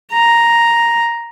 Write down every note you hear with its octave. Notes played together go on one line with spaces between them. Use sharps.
A#5